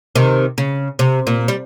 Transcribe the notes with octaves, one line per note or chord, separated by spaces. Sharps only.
C3 D#3
C#3
C3
A#2
G3